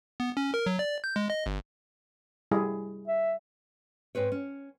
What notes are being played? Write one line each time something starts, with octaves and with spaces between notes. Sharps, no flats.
B3
C#4
A#4
F#3
D5
G6
G#3
D#5
G1
G3 E4 G#4
E5
G#2 C4 B4 C#5
C#4